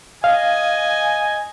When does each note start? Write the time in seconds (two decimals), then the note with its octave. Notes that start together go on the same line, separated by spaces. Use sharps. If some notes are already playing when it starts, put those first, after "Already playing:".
0.24 D#5 F5 G#5